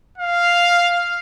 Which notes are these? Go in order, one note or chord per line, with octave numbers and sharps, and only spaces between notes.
F5